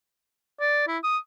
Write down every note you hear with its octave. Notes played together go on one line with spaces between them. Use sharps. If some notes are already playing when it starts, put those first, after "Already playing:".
D5
E4
D#6